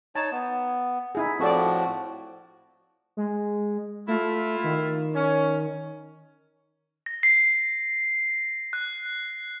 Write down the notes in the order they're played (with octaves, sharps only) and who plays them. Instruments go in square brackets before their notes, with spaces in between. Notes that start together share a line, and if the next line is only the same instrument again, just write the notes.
[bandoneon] D#4 C#5 [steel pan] A5
[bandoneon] B3
[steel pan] D#4 E4 G#4
[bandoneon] A2 F3 F#4 [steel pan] C4 A4 D5
[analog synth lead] G#3
[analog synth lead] A3 [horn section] E4 F4
[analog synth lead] D#3
[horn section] C#4
[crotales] A#6
C7
F#6